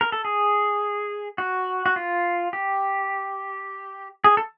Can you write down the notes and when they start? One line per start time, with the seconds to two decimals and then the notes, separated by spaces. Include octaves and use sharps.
0.01 A#4
0.12 A4
0.25 G#4
1.38 F#4
1.86 F#4
1.96 F4
2.53 G4
4.24 G#4
4.37 A4